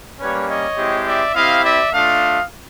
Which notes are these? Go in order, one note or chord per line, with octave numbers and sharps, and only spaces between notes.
G3 A#3 C#4 B4 C#5
C#5 D#5
G#3 C4 E4 G4
D5 E5
C4 E4 G4 D#5 F5
D5 E5
A3 D4 F4 D#5 F5